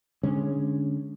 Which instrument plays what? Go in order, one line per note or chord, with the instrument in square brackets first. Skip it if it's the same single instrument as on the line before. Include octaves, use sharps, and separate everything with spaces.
[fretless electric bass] D3 G#3 C#4